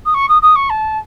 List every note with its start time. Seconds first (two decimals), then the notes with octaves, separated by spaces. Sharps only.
0.05 D#6
0.14 C#6
0.29 D#6
0.42 D#6
0.56 C#6
0.70 A5